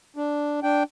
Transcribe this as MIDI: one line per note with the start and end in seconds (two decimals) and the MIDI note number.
0.16 0.60 62
0.63 0.83 62
0.63 0.83 79